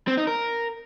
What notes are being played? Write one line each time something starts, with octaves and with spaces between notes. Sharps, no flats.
C4
D#4
A#4